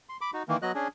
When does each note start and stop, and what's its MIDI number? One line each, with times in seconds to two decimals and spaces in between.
0.09 0.17 84
0.21 0.31 83
0.21 0.31 86
0.33 0.43 63
0.33 0.43 66
0.48 0.57 51
0.48 0.57 52
0.48 0.57 58
0.62 0.72 54
0.62 0.72 59
0.62 0.72 66
0.62 0.72 75
0.62 0.72 90
0.75 0.88 61
0.75 0.88 62
0.75 0.88 68